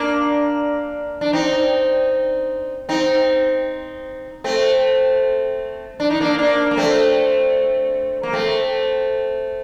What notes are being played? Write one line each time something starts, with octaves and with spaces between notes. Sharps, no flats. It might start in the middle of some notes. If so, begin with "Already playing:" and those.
Already playing: A#3 D4
D4
C4 D#4
C4 D#4
A3 C4
D4
D#4
A#3 D4
A#3 D4
A#3
A3 C4
A#3
A3 C4